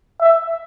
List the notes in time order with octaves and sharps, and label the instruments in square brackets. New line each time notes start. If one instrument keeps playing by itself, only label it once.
[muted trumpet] E5